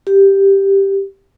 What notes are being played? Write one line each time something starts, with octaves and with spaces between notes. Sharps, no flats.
G4